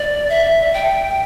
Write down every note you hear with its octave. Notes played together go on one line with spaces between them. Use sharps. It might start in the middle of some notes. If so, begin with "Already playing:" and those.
Already playing: D5
E5
G5